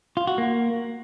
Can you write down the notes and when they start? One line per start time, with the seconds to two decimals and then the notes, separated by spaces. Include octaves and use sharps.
0.17 F4
0.27 F#4
0.38 A#3